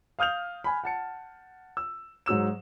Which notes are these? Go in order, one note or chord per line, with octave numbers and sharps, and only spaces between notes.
F5 D#6 F6 G6 F7
G#5 B5
F#5 A5 C#7
E6
G#2 F#3 E6 E7